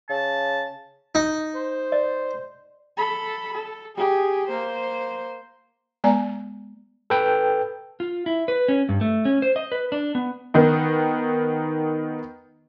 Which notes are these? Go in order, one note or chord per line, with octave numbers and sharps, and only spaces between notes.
C#3 A5
D#4
C5
D5 D#5
A4 B5
A4
G4 G#4
A#3 C5
G#3 B3 D5 G#5 A#5
A4 B4 G5
F4
E4
B4
C#4
G2
A3
C#4
C5
D#5
B4
D4
B3
D#3 B3 D#4